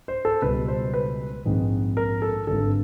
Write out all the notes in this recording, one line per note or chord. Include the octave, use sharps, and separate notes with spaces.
C5
A4
C#2 B2 G3 B4
C5
B4
A#1 G#2 D#3 G#3 C4
A#4
A4
G#1 G2 D3 A4